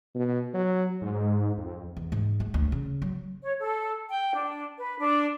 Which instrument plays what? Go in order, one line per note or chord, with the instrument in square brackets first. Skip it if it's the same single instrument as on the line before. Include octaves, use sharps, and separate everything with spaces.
[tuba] B2
F#3
[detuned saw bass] G#2
F2
[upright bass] E2
G#2
G#3
D2
C#3
F#3
[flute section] C#5
A4
G5
D4
B4
D4